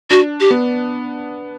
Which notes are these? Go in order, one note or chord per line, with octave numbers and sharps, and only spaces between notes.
D4 F#4
G4
B3